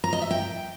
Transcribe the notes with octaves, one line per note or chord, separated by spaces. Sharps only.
A#5
D#5
E5
G5